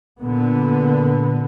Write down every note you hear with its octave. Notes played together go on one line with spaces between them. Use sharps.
A#2 D3 B3